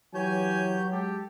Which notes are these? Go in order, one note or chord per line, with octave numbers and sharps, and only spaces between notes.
E3 F#3 G4 C#5 G#5 G6
G#3 G4 A4